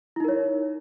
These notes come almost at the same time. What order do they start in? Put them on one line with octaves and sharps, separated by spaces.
E4 D#4 A#4 C#5